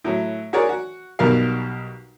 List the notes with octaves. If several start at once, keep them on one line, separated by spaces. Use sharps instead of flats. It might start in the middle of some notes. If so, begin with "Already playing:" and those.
A2 F#3
F#4 G#4 A#4 C#5 D5
F#4
B1 B2 G3 A#4 F5